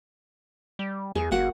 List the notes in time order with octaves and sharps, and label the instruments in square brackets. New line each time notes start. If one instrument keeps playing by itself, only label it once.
[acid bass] G3
[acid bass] E2 [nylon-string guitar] G#4
[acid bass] F#1 [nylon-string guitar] A#3 F#4 F#5